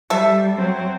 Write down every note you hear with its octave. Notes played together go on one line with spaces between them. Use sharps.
G3 A4 E5
F#3 C4